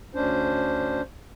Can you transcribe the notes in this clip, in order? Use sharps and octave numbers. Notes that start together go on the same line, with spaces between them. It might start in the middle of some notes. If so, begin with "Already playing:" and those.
D2 C#4 D4 C5